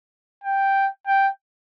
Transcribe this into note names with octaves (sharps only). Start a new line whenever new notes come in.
G5
G5